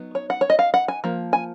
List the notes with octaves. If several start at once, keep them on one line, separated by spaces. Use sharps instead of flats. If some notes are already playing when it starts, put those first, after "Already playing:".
Already playing: F#3 B3 D#4
C#5
F#5
C#5
D#5
F5
F#5
G#5
F3 A#3
G#5